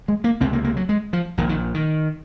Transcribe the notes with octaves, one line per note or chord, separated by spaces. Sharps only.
G#3
A#3
C#2 C3 C4
A#3
A#3
F#3
G#3
F3
A#1 A#2 D#3
D#3
D#3